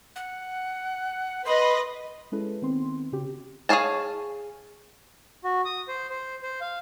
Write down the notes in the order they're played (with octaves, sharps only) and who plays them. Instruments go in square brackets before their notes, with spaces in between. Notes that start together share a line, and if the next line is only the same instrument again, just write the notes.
[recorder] F#5
[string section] B4 D#5 [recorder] C6
[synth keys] G#3 C#4 E4 G#4 A4 B4
D#3 B3 C4 C6
C#3 C#4 F#4 G4
[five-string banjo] G#4 C#5 F5 G#5 A5
[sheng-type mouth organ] F#4
D#6
C5
C5
C5
F5